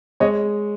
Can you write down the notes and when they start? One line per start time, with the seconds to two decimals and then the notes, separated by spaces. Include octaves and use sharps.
0.20 G#3 C#5 D#5